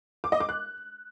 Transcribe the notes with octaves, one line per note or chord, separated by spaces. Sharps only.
D6
D#5
D6
F#6